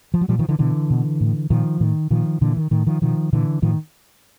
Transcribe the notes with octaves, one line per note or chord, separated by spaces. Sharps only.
F3
F#3
A#2 F3 G3
D#3 F3
D3 E3
B2 D3 E3
B2
A2
A#2 D#3 F3
A2 D#3
A#2 D#3 F3
A#2 D3 E3
D#3
A2 D#3
D#3 F3
B2 D#3 F3
A#2 D3 E3
A2 D#3 F3